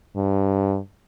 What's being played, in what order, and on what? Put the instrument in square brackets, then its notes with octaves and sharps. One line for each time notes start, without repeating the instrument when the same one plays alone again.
[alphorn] G2